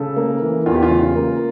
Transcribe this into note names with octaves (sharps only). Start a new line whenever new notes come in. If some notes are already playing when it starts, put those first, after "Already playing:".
Already playing: C#3 A4
A#3
E3
E2 F4
G4
F4
C#3
A#3